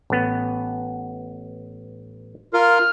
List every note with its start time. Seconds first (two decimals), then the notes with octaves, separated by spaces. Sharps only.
0.10 A1 B3
2.53 F4 A#4 F6